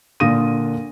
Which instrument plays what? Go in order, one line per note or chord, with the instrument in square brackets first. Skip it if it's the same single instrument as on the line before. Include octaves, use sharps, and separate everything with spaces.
[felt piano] A#2 D3 A#3 D#6 A#6 D#7